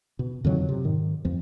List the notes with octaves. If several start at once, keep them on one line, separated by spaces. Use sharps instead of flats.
B2
F2 D3 D#3 F#3
C3
G#2 D#3
F2 F3